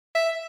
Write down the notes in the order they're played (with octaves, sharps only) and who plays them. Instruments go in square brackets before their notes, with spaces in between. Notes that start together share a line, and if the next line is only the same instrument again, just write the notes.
[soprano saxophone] E5